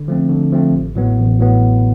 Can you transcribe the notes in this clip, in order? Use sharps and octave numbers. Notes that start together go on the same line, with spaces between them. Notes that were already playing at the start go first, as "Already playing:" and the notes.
Already playing: D3
F3 A3 C4
D3
F3 A3 C4
A1
A2 F#3 B3
A1
A2 F#3 B3